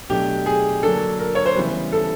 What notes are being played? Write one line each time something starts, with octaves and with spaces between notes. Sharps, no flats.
B2 F#3 A3 D4 G4
G#4
D3 F#3 A#3 D4 A4
A#4
C#5
C5
C#3 E3 G3 B3 B4
A4